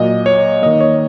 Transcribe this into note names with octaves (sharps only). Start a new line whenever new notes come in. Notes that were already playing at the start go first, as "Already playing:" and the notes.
Already playing: A#2 F#3 A#3 D#5
C#5
D#3 A#3 D#5
C#5